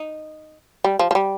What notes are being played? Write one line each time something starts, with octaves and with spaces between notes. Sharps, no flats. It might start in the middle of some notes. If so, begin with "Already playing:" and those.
Already playing: D#4
G3
F3
F3
G3